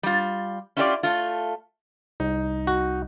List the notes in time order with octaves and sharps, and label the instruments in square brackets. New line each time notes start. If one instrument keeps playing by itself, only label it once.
[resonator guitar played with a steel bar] G3 F4
C#4 E4 F4 G4 C5 D5
A3 F4
[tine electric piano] C2 [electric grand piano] D#4
[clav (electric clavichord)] F#4